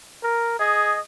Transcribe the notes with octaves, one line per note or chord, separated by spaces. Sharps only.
A#4
G#4 D#5